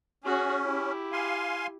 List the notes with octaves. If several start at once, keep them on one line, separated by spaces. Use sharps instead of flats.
C#4 F#4 G#4
E4 G4
F5 G#5 C6